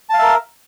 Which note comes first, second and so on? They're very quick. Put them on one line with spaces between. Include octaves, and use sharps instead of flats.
A5 F5 E5 A#4